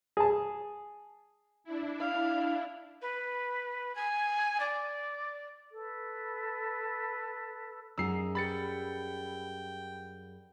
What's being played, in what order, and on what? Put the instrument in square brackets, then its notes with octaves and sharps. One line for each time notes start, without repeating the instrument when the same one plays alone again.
[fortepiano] G#4 A5
[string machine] D4 E4
[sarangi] F5
[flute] B4
G#5
D5
[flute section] A4 B4
[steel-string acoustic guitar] F#2 G#4 F#5 [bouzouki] D#4 [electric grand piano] E6 C7
[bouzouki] G3 B4 [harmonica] G5 [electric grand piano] B5 A6 C#7